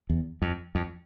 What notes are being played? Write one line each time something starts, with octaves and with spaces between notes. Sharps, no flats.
E2
F2
F2